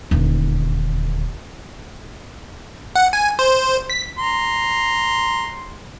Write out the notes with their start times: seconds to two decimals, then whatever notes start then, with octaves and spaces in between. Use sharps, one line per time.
0.11 D#1 D2
2.96 F#5
3.13 G#5
3.39 C5
3.90 B6
4.18 A#5 C6